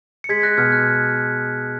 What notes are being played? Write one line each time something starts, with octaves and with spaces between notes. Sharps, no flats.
C#7
G#3 G#6 B6
F#6 A#6
B2 F6 G#6
F#6